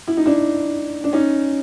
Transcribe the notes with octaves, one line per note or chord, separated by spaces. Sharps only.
E4
D#4
D4 E4
D4
C#4 D#4